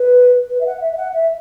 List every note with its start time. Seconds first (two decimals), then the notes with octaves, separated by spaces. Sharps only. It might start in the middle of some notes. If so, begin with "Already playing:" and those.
Already playing: B4
0.49 B4
0.60 E5
0.66 F#5
0.80 E5
0.92 E5
0.97 F#5
1.13 E5